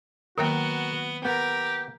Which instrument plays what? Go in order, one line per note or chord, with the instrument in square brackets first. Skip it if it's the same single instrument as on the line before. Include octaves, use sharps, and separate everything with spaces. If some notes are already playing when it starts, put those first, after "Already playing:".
[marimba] D#3 F#3 A#3 [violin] B3 [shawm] F#4 [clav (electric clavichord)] A#4
[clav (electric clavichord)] B3 [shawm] G4 [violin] A#4